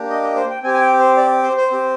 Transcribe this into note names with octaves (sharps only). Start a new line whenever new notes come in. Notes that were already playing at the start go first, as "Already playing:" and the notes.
Already playing: A#3 D4 G4
D#5
D#5
C5
G5
C4 G4 G#5
G#5
G5
C5
D5
C5
C5
C4 G4